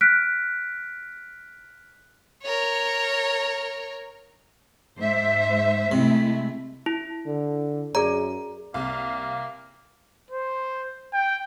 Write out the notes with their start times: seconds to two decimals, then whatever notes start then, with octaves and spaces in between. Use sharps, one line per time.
0.01 F6 F#6 B6 D7
2.43 A#4 C#5
4.98 G#2 C5 E5
5.92 C3 G#3 A3 E4
6.86 E4
7.26 D3
7.95 F#2 G#4 D5 A#5
8.74 C2 A#3 F5
10.31 C5
11.13 G5